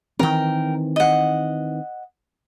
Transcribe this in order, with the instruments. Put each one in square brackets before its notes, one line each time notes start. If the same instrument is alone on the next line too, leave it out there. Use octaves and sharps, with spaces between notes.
[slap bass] D#3 E3 C4 [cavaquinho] A#4 G5
[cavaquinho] D#5 F#5